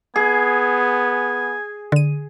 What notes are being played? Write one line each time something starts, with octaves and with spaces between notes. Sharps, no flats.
B3 G#4 G#5
D3 D#7